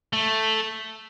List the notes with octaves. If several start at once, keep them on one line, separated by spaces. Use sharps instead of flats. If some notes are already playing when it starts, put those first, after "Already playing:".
A3